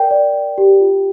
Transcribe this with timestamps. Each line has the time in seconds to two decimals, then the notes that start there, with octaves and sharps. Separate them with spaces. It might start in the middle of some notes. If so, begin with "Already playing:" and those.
Already playing: A#4 D5 G5
0.11 D5
0.33 D5
0.58 G4
0.80 F4